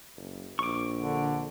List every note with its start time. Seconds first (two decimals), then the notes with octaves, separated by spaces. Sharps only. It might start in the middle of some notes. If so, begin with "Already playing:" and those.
0.17 F#1
0.59 A#1 C#6 D6
0.97 D3